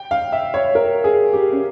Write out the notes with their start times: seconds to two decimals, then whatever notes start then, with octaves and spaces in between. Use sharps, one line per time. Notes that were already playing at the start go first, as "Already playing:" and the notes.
Already playing: G5
0.11 F5
0.32 E5
0.54 C#5
0.75 A#4
1.04 G#4
1.33 G4
1.52 C#4